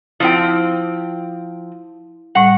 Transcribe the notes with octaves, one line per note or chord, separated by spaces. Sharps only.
F3 C4 E4 G5
A2 G3 F#5